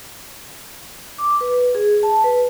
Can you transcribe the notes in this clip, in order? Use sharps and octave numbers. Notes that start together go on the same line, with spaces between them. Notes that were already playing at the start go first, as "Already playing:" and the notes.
D6
B4
G#4
A5
B4